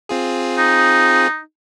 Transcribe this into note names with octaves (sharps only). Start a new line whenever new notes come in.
C4 F4 G#4
D#4